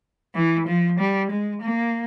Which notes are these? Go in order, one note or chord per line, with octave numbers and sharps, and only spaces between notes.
E3
F3
G3
G#3
A#3